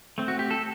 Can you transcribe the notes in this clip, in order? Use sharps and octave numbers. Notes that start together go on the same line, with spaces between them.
A3 C4
F#4
G4
A4